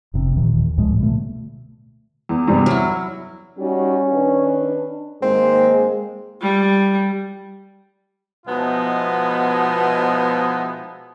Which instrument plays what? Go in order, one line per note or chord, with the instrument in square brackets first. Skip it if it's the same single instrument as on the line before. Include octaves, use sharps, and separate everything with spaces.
[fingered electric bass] F1 C3 C4
D#2 A#2 D#3 E3
C#2 A2 F3 G#3
B2 D3 A3
[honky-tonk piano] E2
E2 G2 C3
[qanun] F#3 E4 [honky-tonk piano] F6
[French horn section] G3 D#4 F#4 [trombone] C#4
[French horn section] D#3 D4 B4
[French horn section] G#2 D#3 A#3 [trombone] G#3 [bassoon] C4
[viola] G3
[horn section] B2 F3 G#3 B3 D#4 E4